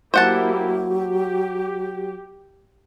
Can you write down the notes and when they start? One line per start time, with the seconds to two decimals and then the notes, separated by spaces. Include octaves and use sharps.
0.14 F#3 A#3 E4 G4 C5 F#5 A5
0.91 G4